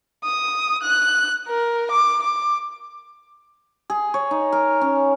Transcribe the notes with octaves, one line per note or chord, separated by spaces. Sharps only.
D#6
F#6
A#4
D6
D6
G#4
C#5
D#4
A#4
C#4